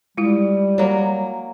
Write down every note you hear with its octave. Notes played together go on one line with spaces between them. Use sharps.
G3 G#3 E4 F4
F#3 A#3